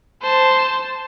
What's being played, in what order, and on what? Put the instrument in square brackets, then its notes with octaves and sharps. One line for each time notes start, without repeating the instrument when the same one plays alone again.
[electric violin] C5 A5